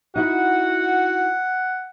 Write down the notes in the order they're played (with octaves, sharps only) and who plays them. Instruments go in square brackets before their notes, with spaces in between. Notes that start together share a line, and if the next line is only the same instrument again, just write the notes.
[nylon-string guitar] D#4 E4 [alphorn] F#4 [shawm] F#5